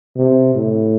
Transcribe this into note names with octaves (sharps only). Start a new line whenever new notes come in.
C3
A2